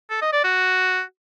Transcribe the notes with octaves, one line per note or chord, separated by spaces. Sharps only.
A4
D#5
D5
F#4